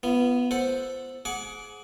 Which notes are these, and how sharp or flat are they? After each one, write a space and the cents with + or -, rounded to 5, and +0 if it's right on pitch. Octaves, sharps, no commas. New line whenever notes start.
B3 +0 F4 -35
A4 +0 C5 +0 F#5 +0
G#4 +20 F#5 +0 D6 -15